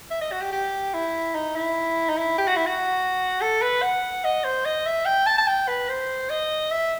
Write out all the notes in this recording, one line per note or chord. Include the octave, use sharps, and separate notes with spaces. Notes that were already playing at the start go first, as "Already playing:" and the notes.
E5
D#5
F#4
G4
G4
E4
D#4
E4
D#4
E4
G4
F#4
E4
F#4
A4
B4
F#5
D#5
C5
D#5
E5
G5
A5
A5
G5
B4
C5
D#5
E5